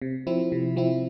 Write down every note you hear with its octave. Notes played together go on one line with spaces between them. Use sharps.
C3
F3 C4 E4
C3
F3 C4 E4